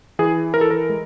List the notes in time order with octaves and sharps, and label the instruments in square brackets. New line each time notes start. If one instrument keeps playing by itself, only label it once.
[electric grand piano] E3 G#4
E3 A#4
A4
A#4
G#3